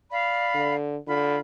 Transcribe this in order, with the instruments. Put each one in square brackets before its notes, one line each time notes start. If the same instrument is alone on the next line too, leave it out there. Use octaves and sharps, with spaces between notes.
[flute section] D5 F5 B5
[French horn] D3
[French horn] D3 [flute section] F4 B5